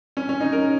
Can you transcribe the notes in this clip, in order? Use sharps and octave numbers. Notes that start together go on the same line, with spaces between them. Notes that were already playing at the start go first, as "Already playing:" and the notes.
C#4
C#4
D#4
A#4